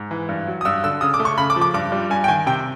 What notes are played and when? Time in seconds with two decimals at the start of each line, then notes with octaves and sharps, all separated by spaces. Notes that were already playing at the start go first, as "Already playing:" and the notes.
Already playing: G#2
0.11 E3
0.29 G2
0.47 F#3
0.61 D#6
0.65 G2 E6
0.83 D3 E6
1.01 C#3 D#6
1.14 D6
1.20 A3
1.25 C#6
1.38 C#3 B5
1.50 D6
1.56 F3
1.61 D6
1.74 G2 D6
1.92 G3
2.10 G2 G#5
2.24 G5
2.28 D#3 G#5
2.46 C3 G5